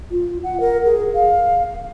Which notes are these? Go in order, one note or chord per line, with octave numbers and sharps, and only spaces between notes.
F4
F#5
A#4
G#4
F5